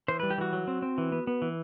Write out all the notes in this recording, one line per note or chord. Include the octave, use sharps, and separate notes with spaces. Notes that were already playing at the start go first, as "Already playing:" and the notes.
E3 C5
G3 B4
G4
E3 F#4
F#3
C4
C4
E3
B3
B3
E3